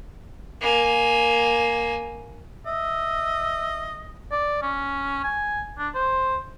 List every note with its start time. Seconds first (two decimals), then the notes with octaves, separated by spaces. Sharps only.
0.61 A#3 G#5
2.66 D#5 E5
4.32 D5
4.62 C#4
5.23 G#5
5.78 D4
5.94 C5